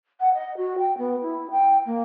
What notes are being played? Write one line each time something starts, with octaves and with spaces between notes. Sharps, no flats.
F#5
D#5
F#4
G5
B3
E4
G5
A#3